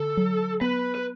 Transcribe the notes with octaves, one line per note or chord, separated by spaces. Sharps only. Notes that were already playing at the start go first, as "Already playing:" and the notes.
Already playing: D3 A4
F#3
B3 B4
B4